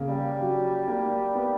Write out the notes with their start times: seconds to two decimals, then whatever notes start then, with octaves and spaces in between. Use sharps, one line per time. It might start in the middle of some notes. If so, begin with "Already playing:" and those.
Already playing: C#3 A#3
0.09 G3
0.41 F#3
0.88 A#3
1.35 B3